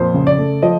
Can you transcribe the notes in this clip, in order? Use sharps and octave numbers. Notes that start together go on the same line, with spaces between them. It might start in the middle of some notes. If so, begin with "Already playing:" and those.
Already playing: F2 A#2 C5
C#3
D5
A3
F3 D#5